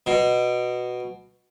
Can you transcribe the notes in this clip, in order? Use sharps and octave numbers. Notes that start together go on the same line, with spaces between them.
B2